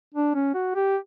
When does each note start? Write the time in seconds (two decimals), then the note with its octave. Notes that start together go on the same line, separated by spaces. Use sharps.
0.15 D4
0.35 C#4
0.54 F#4
0.75 G4